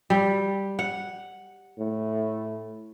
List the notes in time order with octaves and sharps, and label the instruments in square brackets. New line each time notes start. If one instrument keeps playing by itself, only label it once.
[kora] G3
F#5
[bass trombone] A2